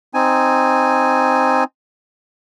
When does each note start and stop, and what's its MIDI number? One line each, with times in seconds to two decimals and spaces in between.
0.14 1.64 60
0.14 1.64 63
0.14 1.64 80